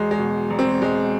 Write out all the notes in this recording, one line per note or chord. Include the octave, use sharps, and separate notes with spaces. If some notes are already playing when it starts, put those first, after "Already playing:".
Already playing: E1 G#3
G#3
B2
E1
C4
E1 G#3